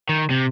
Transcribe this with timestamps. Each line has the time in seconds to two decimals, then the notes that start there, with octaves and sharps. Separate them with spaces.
0.09 D#3
0.30 C3